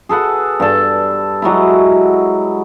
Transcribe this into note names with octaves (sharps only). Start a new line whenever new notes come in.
G#4 A4 B4 F#5
G2 A4
F#3 G#3 E4